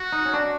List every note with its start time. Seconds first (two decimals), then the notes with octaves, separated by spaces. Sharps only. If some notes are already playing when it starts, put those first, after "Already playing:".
Already playing: F#4
0.12 D#4
0.26 C#4
0.34 D4